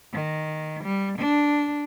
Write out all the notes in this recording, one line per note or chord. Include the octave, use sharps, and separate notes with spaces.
D#3
G3
D4